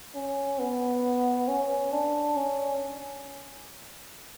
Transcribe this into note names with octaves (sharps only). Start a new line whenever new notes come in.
C#4
B3
C#4
D4
C#4